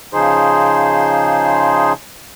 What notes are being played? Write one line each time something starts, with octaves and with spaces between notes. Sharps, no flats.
C#3 F3 D#4 G#4 C5 C6